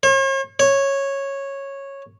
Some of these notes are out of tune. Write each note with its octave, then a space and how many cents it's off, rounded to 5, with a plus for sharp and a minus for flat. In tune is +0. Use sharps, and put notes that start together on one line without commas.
C#5 -45
C#5 -10